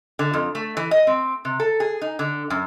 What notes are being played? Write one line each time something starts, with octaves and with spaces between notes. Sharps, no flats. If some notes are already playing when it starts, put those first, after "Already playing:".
D3
F2
A3
E3
D#5
C4
C3
A4
G#4
D#4
D3
F#2